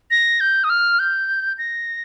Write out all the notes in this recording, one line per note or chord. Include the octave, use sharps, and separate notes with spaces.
A#6
G6
D#6
F6
G6
A#6